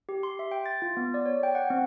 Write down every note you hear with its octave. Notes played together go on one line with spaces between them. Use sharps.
G4
C6
E5
G5
A6
F4
B3
D5
C#5
G5
F#5
C4